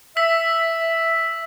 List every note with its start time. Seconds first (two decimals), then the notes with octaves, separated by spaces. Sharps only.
0.17 E5 E6 B6